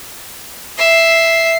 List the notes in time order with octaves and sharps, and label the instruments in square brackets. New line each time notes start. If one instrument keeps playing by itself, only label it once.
[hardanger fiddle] E5 [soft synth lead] C7